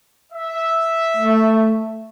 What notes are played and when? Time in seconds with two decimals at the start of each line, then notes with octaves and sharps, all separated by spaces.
0.33 E5
1.17 A3